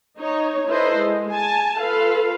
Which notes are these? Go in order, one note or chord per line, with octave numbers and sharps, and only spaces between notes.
D#4 C#5
D#4 E4 A4 B4 C5 D#5
G#3
G#5 A5
F4 A4 B4 F5